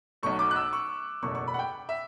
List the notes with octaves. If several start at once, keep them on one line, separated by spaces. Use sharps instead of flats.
B1 B2 F#3 A3 C#6
D6
F#6
E6
C#6
F#1 E2 B2 A3 C#6
C#6
B5
F#5
G5
E5